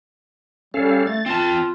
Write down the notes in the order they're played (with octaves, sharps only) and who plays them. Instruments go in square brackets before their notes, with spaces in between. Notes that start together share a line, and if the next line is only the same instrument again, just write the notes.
[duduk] G3 [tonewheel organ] C#4 A4 F5
[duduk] A3 [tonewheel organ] A6
[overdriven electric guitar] C4 A5 [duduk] F4